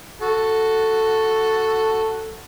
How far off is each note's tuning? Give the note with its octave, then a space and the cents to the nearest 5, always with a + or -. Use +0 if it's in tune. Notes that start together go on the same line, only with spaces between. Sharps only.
F#4 +0 A4 +5